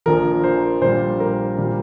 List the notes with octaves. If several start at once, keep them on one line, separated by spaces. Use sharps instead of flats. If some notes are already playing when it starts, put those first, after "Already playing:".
A#1 A#2 F3 A#4
C5
A#1 A#2 G3 C5
A#4
A#2 G3